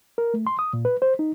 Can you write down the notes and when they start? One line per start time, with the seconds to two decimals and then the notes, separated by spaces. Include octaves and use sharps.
0.18 A#4
0.34 A3
0.47 C6
0.59 D#6
0.73 A#2
0.85 B4
1.02 C5
1.19 D#4